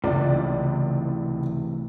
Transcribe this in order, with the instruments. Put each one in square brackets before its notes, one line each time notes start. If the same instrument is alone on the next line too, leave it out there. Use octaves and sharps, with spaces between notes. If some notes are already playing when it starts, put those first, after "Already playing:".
[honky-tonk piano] C#2 D5 [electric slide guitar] A2 C3 E3